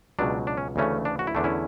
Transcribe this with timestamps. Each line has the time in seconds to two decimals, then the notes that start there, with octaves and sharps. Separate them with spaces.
0.19 C#2 B2 F#3 D4
0.47 D4
0.57 C#4
0.76 D2 C#3 E3 A3 C#4
1.05 D4
1.19 F#4
1.27 E4
1.35 E2 D3 A3 D4
1.44 C#4 E4